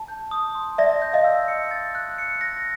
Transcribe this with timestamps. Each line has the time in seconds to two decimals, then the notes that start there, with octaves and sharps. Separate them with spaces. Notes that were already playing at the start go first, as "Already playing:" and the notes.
Already playing: A5
0.08 G6
0.31 D#6
0.55 C6
0.78 D5 E5 A#6
1.02 G6
1.13 D#5 F5
1.24 E6
1.48 C#7
1.71 A6
1.95 F#6
2.18 C#7
2.41 A#6